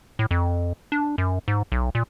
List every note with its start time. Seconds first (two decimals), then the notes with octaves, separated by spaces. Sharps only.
0.19 A2
0.31 F2
0.92 D4
1.18 F#2
1.48 G#2
1.72 B1
1.95 A#2